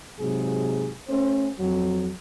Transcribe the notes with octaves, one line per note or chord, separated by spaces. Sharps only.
G#2 C3 F#3 G#4
A3 C#4 C5
F2 F#3